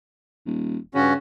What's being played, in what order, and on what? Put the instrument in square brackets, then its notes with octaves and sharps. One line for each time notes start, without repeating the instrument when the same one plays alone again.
[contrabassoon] D#1
[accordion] G2 C#4 F#4 [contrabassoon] C#3